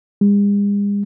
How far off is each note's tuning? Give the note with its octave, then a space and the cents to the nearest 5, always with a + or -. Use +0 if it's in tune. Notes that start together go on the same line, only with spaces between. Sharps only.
G#3 -45